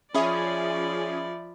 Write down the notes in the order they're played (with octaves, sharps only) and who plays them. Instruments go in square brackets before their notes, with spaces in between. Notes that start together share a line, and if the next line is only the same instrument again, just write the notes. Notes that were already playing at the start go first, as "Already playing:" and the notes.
[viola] F3 D5 [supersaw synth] C#4 G#4 [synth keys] E5 B5